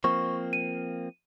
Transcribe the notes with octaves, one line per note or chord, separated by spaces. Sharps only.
F3 A#3 C4 C#6
D#7